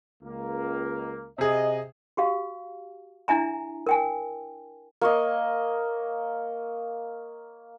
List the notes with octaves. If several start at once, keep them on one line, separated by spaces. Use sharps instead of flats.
C#2 A#3
C3 G#4 D#5
F#4 G4 F5
D4 E4 E5 G#5 A#5
A#4 G5 G#5
A#3 C#5 D#5